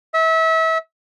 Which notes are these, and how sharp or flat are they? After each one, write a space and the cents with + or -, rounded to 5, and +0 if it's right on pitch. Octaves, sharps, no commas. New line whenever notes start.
E5 -30